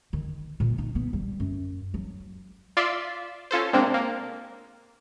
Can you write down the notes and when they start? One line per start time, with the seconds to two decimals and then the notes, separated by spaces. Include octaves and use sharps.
0.13 D#3
0.60 A#2
0.78 D#4
0.95 B3
1.13 G3
1.40 F#2
1.94 F#3
2.77 F4 D5 E5 C6
3.51 C#4 F4 A4 C5
3.73 C3 G#3 A#3 C4 D4
3.94 A#3